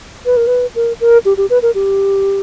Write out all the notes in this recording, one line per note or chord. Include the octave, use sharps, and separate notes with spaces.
B4
A#4
B4
A#4
A#4
G4
G4
B4
A#4
G4